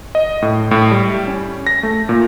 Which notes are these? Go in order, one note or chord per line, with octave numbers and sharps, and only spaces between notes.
D#5
A2
A2
G3
C#4
A#6
A3
A#2